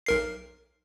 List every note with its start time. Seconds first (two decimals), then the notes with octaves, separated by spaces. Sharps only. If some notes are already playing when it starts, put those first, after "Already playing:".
0.06 B1 A#4 C7